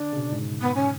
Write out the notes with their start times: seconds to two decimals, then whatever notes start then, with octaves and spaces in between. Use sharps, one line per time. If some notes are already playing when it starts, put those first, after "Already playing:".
Already playing: D3 D4
0.13 C#3
0.17 B2
0.32 G#2
0.61 B3
0.75 C#4